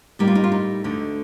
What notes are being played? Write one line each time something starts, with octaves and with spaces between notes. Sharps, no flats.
A2 G3 A#3 D#4
F4
D#4
F4
D#4
D2 D3 A3